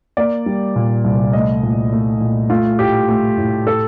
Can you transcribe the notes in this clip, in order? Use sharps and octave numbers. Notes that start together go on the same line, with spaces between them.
A#3 D5
G3
A#2
C2
A3 D#5
A#2
A3
A#2
A3 F4
A2 G4
A3
A2
A4